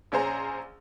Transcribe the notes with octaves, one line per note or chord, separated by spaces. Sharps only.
A#1 C#4 G#4 C5 A#5